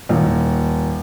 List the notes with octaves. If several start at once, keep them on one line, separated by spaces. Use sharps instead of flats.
D#1